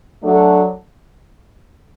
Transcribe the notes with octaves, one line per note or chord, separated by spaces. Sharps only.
F#3 A3 D4 F#4 A4